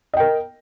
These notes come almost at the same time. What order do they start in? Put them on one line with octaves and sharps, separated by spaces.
D#5 G5 A#4